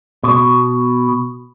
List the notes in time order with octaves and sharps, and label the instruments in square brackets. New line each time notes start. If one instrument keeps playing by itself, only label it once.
[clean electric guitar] B2